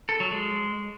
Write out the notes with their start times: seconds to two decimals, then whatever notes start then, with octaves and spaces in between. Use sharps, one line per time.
0.09 A4
0.20 F#3
0.31 G#3